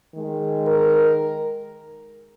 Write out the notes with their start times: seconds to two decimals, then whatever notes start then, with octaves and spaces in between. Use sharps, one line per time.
0.15 D#3 G#3
0.67 A#4